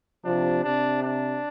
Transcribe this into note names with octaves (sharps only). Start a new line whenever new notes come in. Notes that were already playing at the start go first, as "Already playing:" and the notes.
C3 F3 D4
C3 D4
D4